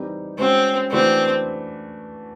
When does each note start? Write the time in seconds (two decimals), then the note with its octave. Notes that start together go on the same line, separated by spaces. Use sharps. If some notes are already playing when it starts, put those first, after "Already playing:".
Already playing: E3 G3 C4 D#4 G4
0.39 G#3 C4 C#4 F#4
0.91 E3 A3 C4 D4 F#4